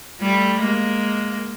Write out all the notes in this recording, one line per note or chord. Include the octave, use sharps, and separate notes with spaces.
G3 A3
G#3 A#3